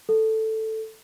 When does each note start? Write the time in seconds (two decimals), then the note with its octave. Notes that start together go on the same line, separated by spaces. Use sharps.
0.09 A4